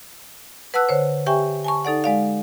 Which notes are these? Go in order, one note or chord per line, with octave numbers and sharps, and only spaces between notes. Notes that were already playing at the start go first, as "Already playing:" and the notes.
B4 F#5 A5 E6 F#6
D3 C5 C#5
G4 E5 G5 G#5 C#6
G#5 A5 C#6
D#4 A4 D5 F#5
G#3 D5 F5